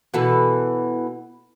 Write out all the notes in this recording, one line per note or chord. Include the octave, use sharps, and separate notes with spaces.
B2 E3 A4